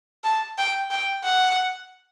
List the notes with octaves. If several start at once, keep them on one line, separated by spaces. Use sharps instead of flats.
A5
G5
G5
F#5